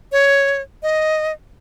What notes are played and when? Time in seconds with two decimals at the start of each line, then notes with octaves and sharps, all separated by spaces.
0.12 C#5
0.83 D#5